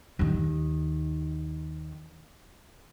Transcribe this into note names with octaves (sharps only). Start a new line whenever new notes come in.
D#2 D#3